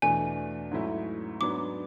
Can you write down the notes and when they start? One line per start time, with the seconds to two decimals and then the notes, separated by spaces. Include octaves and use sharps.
0.02 E2 B2 A3 D4 G#5
0.71 G#2 F#3 A3 C#4 E4
1.41 G#2 F#3 B3 D4 D6